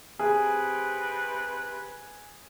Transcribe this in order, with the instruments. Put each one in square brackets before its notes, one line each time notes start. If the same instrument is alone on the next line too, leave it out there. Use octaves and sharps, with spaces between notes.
[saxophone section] C3 B4 [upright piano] G#4